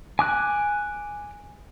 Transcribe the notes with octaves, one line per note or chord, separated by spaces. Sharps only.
G#5 D6 F#6